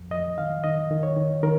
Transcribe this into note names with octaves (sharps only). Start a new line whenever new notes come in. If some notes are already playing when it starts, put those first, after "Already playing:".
Already playing: F2
F2 D#5
D#3 F5
D#3 D#5
D#3
C#5
D#3
D#3 A#4